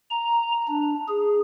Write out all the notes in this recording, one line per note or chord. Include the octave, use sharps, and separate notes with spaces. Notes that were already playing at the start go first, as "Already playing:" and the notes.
A#5
D4
G#4